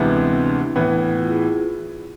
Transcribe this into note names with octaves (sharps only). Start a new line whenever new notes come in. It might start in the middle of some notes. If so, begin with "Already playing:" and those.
Already playing: D2 C3 E3 G#3 B3
C4
C4
D4
E4
A2 E3 B3
F4
E4 G#4
E4
F4